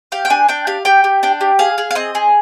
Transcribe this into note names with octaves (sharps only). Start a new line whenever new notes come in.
G4 F5
G5
D4 G#5
D4 G5
G4 F5
G4 G5
G4
D4 G5
G4
G#4 F5
G#4
F5
C4 D#5
G#4